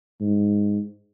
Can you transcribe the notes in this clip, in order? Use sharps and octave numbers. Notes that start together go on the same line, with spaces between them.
G#2